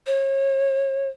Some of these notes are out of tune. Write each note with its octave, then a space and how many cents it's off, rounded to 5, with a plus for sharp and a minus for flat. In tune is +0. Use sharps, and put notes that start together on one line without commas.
C#5 -35